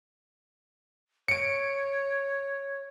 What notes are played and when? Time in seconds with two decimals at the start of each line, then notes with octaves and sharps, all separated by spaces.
1.28 C#5 C#7 D7